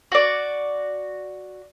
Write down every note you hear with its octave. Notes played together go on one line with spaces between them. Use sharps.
F#4 D5